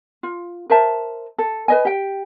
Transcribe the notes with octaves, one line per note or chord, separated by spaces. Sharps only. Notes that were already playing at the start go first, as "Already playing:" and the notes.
F4
A#4 C5 E5 A5
A4
B4 D#5 G#5
G4 G5